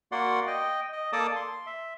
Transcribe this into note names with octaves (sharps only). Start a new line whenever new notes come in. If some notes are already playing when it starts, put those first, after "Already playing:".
A#3 F#4 D5 F#5 C6
D#5 G5
D#5
A#3 A4 D5 A5 D6 D#6
C6
E5